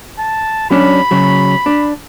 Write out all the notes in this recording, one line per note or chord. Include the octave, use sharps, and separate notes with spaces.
A5
F#3 C#4 D4 B5
C#3 F#3
D4